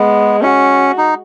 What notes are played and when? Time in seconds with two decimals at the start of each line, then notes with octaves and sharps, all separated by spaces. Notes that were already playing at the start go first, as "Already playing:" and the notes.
Already playing: G#3 B3
0.42 C#4 F#4
0.98 D#4